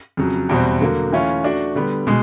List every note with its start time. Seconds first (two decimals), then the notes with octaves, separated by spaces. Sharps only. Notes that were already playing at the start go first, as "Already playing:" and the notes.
0.17 F2 C#3 F#3
0.49 E2 B2 G3 C4
0.81 D3 F#3 A#3
1.12 E3 A3 C#4 F4
1.44 A3 D4 F#4
1.75 D3 G3 B3
2.07 B2 G#3